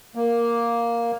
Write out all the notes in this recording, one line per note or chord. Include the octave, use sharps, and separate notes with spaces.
A#3